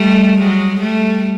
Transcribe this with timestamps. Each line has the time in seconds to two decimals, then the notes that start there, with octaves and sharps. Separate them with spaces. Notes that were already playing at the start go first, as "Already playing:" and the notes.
Already playing: G3 A3
0.38 F#3 G#3
0.80 G3 A3